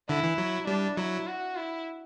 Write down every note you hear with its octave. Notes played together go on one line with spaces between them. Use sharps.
D3 E4
E3
F#3
G3 D4
F#3 E4
F#4
E4